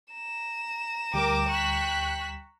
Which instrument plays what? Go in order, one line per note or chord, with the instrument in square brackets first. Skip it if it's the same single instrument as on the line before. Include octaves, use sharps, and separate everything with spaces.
[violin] A#5 E7
[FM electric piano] D2 G3 [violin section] A#4 D6 [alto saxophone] G5
[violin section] C#6 F#6 B6